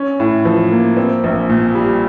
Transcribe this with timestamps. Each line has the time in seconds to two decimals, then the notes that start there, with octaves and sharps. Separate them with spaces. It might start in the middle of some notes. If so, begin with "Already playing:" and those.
Already playing: C#4
0.20 A2
0.45 F3
0.72 A#3
0.97 C4
1.24 A#1
1.49 A#2
1.75 G3